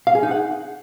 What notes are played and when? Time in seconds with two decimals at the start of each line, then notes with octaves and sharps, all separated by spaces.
0.07 F5
0.15 G#4
0.23 D#4
0.31 F#5